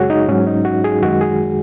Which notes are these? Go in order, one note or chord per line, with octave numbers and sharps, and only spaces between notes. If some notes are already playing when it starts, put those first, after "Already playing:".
Already playing: F#2 C#3 G#3 F#4 G#4 C#5
D#4
G#2 F#3 C#4
D#4
F#4
G#4
F#2 D#3 G#3 F#4
G#4